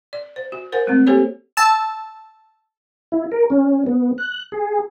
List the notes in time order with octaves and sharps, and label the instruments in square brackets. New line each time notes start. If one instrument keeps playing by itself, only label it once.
[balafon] D5
C5
F#4
A#4 C5 F#5 G#5
G#3 A3 C4
A#3 G4 A4 C5 C#5
[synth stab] A5 E6
[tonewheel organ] E4
A#4
C#4
B3
F#6
G#4